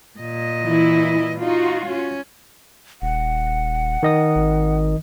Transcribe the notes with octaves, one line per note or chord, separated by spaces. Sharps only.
A#2 D#5
E3 E4
D#4 F4 F#4
C#4
D#1 F#5
D#3 D#5 D#6
G#1